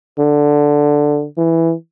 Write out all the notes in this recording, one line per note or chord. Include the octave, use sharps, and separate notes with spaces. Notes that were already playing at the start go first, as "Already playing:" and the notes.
D3
E3